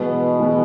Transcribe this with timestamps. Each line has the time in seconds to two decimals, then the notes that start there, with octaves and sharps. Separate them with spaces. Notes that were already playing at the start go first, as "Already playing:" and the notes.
Already playing: B2 E3 G#3 B3
0.39 E3 G#3 B3